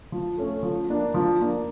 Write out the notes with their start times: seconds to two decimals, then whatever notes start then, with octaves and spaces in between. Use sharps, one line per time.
0.12 F3
0.37 A3 C#4
0.63 F3
0.89 A#3 D4
1.14 F3
1.40 A#3 D4